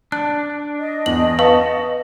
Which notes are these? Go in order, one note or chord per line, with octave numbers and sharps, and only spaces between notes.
D4 F#6
D#5
E2 F#7
B4 F5 A5 C#6